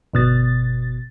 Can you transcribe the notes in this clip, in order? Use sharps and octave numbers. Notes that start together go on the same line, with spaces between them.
G1 B2 A6